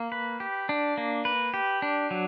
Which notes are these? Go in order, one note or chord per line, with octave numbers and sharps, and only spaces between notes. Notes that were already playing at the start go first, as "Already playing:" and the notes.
Already playing: A#3
B4
G4
D4
A#3
B4
G4
D4
F#3